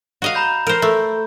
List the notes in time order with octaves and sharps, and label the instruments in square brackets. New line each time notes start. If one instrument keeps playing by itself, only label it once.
[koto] F#4 D#5 F5
[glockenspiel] A#5 B5 G6
[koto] A#4 C5
A3